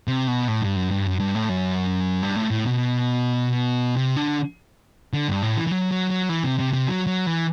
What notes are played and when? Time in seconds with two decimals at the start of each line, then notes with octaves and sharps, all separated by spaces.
0.08 C3
0.28 B2
0.48 A2
0.62 G2
0.76 F#2
0.91 G2
1.06 F#2
1.20 G2
1.35 A2
1.49 F#2
2.22 G2
2.36 A2
2.51 A2
2.66 B2
3.97 C3
4.16 D3
5.13 D3
5.28 G2
5.42 A2
5.56 E3
5.67 E3
5.71 F#3
5.91 F#3
6.10 F#3
6.29 E3
6.44 C3
6.59 C3
6.73 C3
6.88 F#3
7.07 F#3
7.27 E3